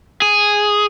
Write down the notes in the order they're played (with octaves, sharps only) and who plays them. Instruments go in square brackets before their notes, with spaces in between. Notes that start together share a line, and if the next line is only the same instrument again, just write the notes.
[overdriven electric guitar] G#4